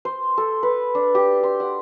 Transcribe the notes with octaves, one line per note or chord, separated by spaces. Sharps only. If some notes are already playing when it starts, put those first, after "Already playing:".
C5
A4
B4
D4
G4
C6
F#5